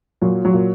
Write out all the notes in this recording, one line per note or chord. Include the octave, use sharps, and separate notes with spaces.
A#2 F#3
F#3
A#2